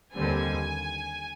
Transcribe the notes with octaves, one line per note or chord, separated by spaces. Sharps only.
D#2 D3 G3 C4 G#5